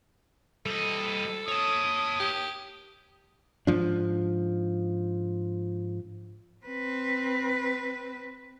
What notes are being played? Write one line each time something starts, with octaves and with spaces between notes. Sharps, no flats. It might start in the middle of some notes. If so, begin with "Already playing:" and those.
G3 A4 D#5
C#5 A5 D#6
G4
G#2 F3 D4
C4 B4